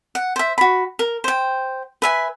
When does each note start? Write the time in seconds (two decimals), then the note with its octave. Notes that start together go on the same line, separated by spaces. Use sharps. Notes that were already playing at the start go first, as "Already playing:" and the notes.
0.15 F#5
0.36 C5 E5
0.58 F#4 B5
0.99 A#4
1.24 C5 G5
2.02 B4 E5 G#5